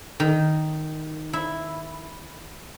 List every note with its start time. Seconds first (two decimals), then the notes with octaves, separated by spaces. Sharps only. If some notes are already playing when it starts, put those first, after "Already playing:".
0.20 D#3
1.33 E4